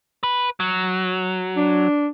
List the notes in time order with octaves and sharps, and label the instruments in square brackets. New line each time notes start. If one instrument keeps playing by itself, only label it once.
[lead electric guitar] B4
F#3
[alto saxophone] D4